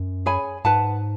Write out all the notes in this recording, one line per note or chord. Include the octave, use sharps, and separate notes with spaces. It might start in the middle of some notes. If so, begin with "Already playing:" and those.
Already playing: F#2
G#4 C#5 G#5 B5
G#2 B4 F#5 A5